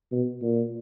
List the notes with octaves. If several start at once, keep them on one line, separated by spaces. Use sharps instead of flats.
B2
A#2